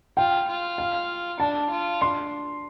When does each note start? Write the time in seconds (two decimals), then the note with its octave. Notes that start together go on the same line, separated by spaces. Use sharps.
0.17 F4 G5
0.48 F4
0.78 F5
1.40 D4 A5
1.70 F4
2.01 D4 C6